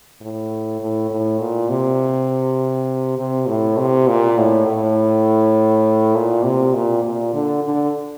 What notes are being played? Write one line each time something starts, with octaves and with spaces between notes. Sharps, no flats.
A2
A2
A2
A#2
C3
C3
A2
C3
A#2
A2
A2
A#2
C3
A#2
A#2
D3
D3